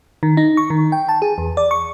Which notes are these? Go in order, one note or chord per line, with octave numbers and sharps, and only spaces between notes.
D#3
D#4
C#6
D#3
G5
A5
G#4
E2
D5
C#6